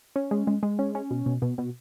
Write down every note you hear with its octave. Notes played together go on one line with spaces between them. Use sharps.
C#4
G#3
G#3
G#3
C#4
C#4
B2
B2
B2
B2